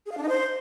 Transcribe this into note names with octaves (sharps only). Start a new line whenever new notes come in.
G#4
F5
D4
D#4
C5